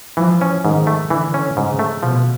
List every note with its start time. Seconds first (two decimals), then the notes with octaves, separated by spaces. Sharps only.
0.17 E3 F3
0.41 C#4
0.64 G#2 D#3
0.87 A3
1.10 D3 E3
1.34 C#4
1.57 G#2 C#3
1.79 A3
2.03 B2 F3